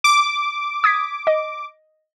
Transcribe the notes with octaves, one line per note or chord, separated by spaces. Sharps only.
D6
D#6 G#6 B6
D#5